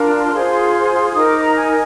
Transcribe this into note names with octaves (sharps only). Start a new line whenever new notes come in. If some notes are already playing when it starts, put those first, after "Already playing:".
Already playing: D4 F4 A#4
C6
F4 G#4 C5
D#4 A#4 D#6
D6
A#5
G#5